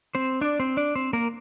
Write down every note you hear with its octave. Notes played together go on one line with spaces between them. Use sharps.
C4 C5
D4 D5
C4 C5
D4 D5
C4 C5
A#3 A#4